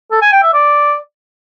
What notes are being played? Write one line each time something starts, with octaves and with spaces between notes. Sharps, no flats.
A4
G#5
G5
E5
D5